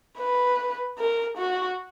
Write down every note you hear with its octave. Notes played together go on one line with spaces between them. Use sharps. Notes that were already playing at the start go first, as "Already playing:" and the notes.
B4
A#4
F#4